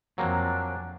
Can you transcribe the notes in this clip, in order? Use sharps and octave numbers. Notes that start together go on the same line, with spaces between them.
F2 F#3 A#3 C4 D4 G5 G#5